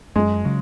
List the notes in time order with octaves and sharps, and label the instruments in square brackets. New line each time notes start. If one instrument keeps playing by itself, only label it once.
[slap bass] F#2 [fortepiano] G#3
[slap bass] C#3 F#3